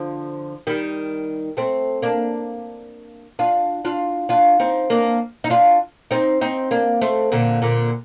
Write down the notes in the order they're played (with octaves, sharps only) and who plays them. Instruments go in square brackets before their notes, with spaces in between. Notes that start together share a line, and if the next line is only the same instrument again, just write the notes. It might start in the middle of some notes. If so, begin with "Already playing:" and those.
Already playing: [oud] D3 F3
D#3 G3
A3 C4
A#3 D4
D4 F4
D4 F4
D4 F4
C4 D#4
A#3 D4
D#4
D4 F4
C4 D#4
C4 D#4
A#3 D4
A3 C4
A#2 D3
A#2 D3